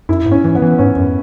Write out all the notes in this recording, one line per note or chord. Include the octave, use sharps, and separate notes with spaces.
F#2 E4
G#2
C#4
E3
B3
E3
G#2 C#4
F#2